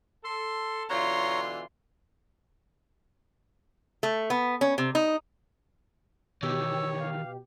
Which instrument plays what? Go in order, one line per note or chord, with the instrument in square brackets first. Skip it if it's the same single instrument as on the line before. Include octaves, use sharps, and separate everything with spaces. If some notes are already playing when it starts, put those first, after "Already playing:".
[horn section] A4 [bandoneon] C6
[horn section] B2 D3 E3 [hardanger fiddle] F4 C6 [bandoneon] C#5 A#5
[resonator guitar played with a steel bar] A3
B3
C#4
C3
D#4
[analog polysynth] B2 G4 [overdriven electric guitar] D#3 E3 [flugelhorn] C#5 [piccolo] E6
[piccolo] F5